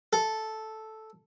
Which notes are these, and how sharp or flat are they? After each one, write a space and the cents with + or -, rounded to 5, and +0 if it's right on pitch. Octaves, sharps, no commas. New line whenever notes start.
A4 -5